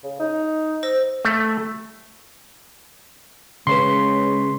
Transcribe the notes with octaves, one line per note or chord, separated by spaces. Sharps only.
C#3
D#4
C5 E6 A#6
A3
C#3 G#3 C#4 B4 C#5 C6 C#6